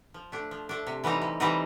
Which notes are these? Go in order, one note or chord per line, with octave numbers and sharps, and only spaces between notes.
F3
A3 D4
F3
A3 D4
C3
E3 G3 C4 D#4
C3
E3 G3 C4 D#4